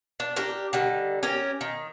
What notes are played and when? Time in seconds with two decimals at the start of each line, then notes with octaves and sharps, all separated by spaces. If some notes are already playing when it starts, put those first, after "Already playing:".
0.20 D4
0.36 D4 G4 A#4
0.73 D3 D#3 G3
1.23 C#4 G4 A#4
1.61 D#3